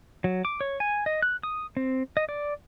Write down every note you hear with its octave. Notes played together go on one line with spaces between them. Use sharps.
F#3
D6
C#5
G#5
D#5
F#6
D#6
C4
D#5
D5